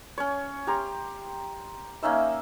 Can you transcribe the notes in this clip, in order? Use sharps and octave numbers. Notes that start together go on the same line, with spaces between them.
C#4 C#5
G4 A#5 C6
A#3 C#4 D#4 E5